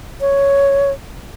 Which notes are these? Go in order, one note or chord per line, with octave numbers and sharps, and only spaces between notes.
C#5